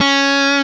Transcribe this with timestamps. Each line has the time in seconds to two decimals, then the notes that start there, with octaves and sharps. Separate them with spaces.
0.01 C#4